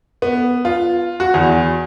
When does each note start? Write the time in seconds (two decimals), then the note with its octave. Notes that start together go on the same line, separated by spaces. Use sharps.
0.22 B3
0.65 F4
1.20 F#4
1.34 E2